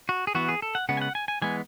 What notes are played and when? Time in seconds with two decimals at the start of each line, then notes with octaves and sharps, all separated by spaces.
0.09 F#4
0.27 G#4
0.35 E3 B3 F#4
0.49 G#4
0.62 A4
0.75 F#5
0.89 C#3 G#3 B3 F#5
0.97 G#5
1.01 F#5
1.15 G#5
1.28 G#5
1.42 E3 G#3 B3 G#5